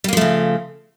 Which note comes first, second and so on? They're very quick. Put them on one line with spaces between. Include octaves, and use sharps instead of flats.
G3 A#3 F3 A3 C#3